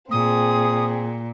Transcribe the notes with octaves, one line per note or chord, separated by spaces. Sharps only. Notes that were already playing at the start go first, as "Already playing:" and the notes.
A#2 C4 G#4 D#6